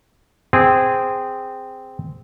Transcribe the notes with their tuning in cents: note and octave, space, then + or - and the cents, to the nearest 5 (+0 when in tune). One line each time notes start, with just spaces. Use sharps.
C4 -10 G#4 -15